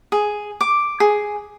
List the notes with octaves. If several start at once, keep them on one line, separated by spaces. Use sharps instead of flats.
G#4
D6
G#4